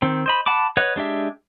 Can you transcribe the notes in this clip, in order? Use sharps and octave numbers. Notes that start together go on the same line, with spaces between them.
D#3 C4
C5 D#5 B5
F#5 A5 B5 D6
B4 C#5 D#5 F#5
G#3 D4 G4 E5